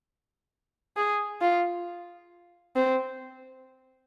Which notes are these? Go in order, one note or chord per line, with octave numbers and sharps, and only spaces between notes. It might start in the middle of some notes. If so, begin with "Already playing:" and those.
G#4
F4
C4